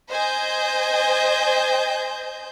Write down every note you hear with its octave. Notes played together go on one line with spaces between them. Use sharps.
C5 D#5 G#5 G6